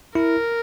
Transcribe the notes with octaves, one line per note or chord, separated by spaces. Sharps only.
E4 A#4